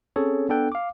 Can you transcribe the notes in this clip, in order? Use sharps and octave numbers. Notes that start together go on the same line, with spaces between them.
C4 C#4 G#4 A4 C#5
B3 D4 A4 G5 F#6
F5 D6